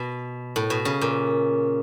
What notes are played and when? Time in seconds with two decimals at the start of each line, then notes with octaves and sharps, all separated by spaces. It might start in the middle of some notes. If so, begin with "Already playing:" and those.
Already playing: B2
0.56 A2
0.70 B2
0.85 C#3
1.01 A#2